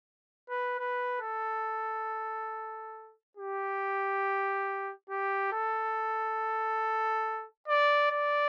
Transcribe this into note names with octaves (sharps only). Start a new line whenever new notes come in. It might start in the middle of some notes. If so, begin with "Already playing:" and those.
B4
B4
A4
G4
G4
A4
D5
D5